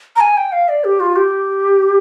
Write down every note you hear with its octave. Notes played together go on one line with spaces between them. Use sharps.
A#5
G#5
G5
F5
D5
G4
F4
G4